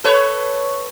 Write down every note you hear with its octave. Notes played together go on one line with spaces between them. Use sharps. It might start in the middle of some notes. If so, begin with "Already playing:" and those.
A4 B4 C#5